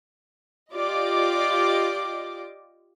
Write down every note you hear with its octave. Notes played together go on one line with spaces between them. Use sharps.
F4 G4 D5 D#5 D6